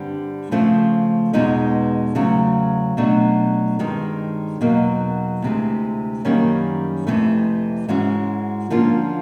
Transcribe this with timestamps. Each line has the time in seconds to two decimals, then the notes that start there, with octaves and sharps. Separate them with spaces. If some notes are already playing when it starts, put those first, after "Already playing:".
Already playing: G2 D3 G3 C4
0.51 C#3 F3 A3 C4
1.33 E2 B2 G#3 B3 D#4
2.15 E2 C#3 F#3 A3
2.97 B2 F#3 A3 D4
3.79 G2 D#3 G#3 C4
4.61 E2 B2 F#3 A#3 D#4
5.42 D2 C3 E3 G#3
6.25 F#2 D#3 G3 A#3 C#4
7.07 F2 C3 E3 A3
7.88 G#2 E3 G#3 C#4 F#4
8.70 D3 F3 A#3 C#4 F4